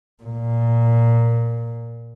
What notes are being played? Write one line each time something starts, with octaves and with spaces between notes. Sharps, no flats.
A#2